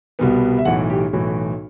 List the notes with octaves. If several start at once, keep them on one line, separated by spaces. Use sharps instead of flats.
C2 B2 G3 B3
E5
B1 A2 E3 F#5
G4
B1 A2 E3 F#4